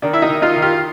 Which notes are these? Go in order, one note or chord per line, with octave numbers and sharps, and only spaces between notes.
D#3 D4
E4
D#4
D#3
D#4 F4
D#3
F4 G4